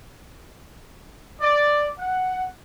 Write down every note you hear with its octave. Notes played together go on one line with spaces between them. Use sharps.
D5
F#5